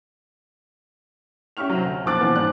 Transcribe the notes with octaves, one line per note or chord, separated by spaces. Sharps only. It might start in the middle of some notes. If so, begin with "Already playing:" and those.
C#4 G4 E5 C#6 F6 F7
C3 F#3
D2
B1 A#2 F3 D6 F#6 A6
A#2 E3 F3 B3
G#2 G3 C4 F#6